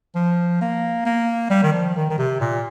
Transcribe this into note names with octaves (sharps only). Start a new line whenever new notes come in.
F3
A#3
A#3
G3
D#3
F3
D#3
D#3
C3
A#2